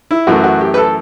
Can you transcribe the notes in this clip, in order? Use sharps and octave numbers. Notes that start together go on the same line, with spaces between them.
E4
F#2 E3 A3 F#4
F#4
G4
B4
A4